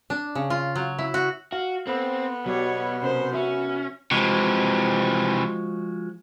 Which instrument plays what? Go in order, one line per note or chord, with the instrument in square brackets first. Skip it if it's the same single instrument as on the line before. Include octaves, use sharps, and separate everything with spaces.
[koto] D4
C#3
F4
F#3
E4
F#4
[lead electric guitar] F#4 [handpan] F5
[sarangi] B3 [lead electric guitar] C4 [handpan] A4
[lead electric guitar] B2 [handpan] F#3 G4 D5 [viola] C#5
[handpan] C3 C#4 A#4 [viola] C5
[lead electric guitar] C#4 [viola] F#4 [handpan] E5
[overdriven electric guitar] C3 E3 [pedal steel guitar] F3 G#3 F#4